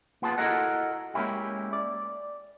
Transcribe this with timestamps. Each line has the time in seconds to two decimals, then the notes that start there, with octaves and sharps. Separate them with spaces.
0.22 A#3 B3 F4 G#4 A5
0.38 E4 F#4 A4 A#4 D#5 F#5
1.14 G#3 A#3 C#4 E4 G4
1.73 D5